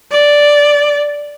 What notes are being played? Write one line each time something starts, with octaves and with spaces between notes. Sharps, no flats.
D5